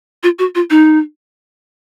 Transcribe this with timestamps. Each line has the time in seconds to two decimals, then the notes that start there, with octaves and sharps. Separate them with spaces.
0.23 F4
0.39 F#4
0.55 F4
0.70 D#4